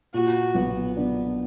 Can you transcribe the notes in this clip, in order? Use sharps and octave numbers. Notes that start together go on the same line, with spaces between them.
A#2 F#4
B1 B3
B3 D4